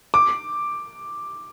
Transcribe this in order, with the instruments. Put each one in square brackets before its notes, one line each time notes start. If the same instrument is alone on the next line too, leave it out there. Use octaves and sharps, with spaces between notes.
[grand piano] D6